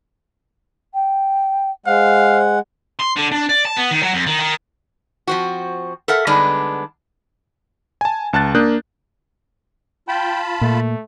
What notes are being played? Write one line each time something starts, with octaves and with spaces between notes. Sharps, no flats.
G5
G#3 C5 F5 F#5
C6
D3
D4
D5
A5
B3
D#3
F#3
F2
D#3
D#3
F3 C4 F#4
A4 A#4 E5 F#5
D3 G3 G#3 B3 D4 D#4
G#5 A5
C#2 A5 F#6 A6
A#3 D4 D#6 F#6 G6
F4 G5 A5 B5
A#2 A3